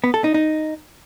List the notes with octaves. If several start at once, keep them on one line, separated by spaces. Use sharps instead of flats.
B3
A4
D#4
D#4